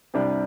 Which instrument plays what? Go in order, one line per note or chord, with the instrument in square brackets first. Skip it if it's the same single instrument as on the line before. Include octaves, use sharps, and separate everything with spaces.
[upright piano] C2 C3 G3 D4